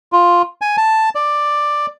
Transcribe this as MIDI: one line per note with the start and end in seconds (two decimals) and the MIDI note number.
0.12 0.42 65
0.61 0.76 80
0.77 1.09 81
1.15 1.86 74